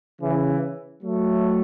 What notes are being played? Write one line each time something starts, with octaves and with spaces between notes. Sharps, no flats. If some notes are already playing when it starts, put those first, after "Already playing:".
C#3 E3
F#3 A3